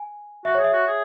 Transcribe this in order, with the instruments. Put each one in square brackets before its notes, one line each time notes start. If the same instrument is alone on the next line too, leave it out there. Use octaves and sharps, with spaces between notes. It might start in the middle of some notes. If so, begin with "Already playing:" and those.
Already playing: [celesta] G#5
[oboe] F#4 [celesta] E5
[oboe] G#4 [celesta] C#5
[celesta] E5
[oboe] F#4
G#4